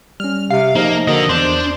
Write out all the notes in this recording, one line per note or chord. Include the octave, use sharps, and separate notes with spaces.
G3 C#4 F6
C3 F5
F3 A#3 D#4 G#4 D#5
D3 A#3 F#4 A#4 D#5
E2 D4 C5